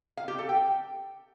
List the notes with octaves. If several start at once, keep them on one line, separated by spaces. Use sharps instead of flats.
F5
G4
A4
G5